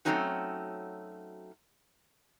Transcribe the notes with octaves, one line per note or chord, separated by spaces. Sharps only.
F#3 A3 C4 C#4 D#4 F#4